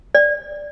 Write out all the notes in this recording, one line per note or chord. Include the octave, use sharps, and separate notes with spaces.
D5